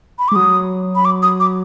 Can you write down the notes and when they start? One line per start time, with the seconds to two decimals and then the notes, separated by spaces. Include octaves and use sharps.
0.19 B5
0.28 G#3 D6
0.36 F#3 D#6
0.96 B5
1.05 D6
1.22 D#6
1.40 D6